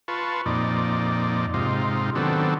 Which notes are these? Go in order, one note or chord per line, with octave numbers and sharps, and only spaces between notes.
F4 B4 A5 C#6
F2 A#2 D#4 D5
G#2 C3 D#4 F4
D#3 F#3 B3 C4 D4 A4